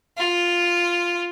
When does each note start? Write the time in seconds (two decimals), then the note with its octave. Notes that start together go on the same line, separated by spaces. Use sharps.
0.18 F4